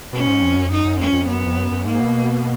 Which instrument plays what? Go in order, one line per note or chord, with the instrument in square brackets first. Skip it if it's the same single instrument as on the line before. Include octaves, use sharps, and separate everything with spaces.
[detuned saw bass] B2 [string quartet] C#4
[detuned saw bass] G#2
F2
F#2
F2
[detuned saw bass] F#2 [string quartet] D#4
[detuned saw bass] F#2
[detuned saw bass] F2 [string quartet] C#4
[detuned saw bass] F2
[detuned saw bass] F#2 [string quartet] B3
[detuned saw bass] F2
F#2
F#2
[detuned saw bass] G#2 [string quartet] A#3
[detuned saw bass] B2